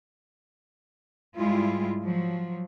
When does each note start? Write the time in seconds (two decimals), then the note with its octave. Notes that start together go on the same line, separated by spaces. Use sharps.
1.36 G#2 G3 G#3 E4 F4
2.03 F3 F#3